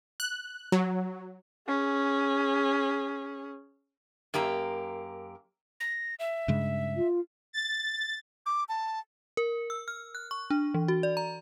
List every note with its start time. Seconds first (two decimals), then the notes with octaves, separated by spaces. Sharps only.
0.20 F#6
0.72 F#3
1.68 C#4 G#4
4.34 F#2 A#3 G4 A#5
5.80 A#6
6.19 E5
6.48 G2 C#3 G#3
6.97 F4
7.53 A6
8.46 D6
8.69 A5
9.37 A#4
9.70 E6
9.88 F6
10.15 F#6
10.31 C#6
10.50 D4
10.74 E3
10.88 F#4
11.03 D5
11.17 A#5